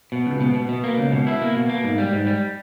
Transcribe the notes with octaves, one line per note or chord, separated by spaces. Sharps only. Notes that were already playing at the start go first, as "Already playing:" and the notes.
B2
C#2
B2
B2
B2
A#3
C#2
B2
E4
A#3
B2
A#3
G#2
G3
G#2
G3